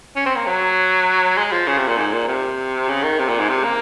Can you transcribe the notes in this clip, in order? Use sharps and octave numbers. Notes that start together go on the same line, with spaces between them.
C#4
C4
A#3
F#3
G#3
F3
C#3
C3
A#2
G#2
A#2
C3
C#3
D#3
C3
A#2
G#2
C3
A#3